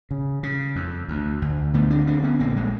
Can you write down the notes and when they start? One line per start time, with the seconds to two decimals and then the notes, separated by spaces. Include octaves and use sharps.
0.11 C#3
0.43 C#3
0.76 F2
1.08 D2
1.42 D2
1.74 D3 A3 B3
1.90 C4 D4
2.07 D2 C4 D4
2.23 B3 C#4
2.40 A#1 A#3 C4
2.57 G#3 A#3